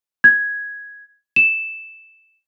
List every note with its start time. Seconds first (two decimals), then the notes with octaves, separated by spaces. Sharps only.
0.24 G#6
1.36 E7